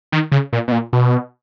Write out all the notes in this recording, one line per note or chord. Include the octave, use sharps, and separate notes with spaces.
D#3
C#3
A#2
B2
A#2
B2